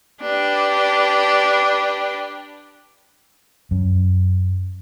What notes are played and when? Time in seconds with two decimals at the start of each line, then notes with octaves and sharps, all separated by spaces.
0.21 D4 G4 B4
3.71 F#2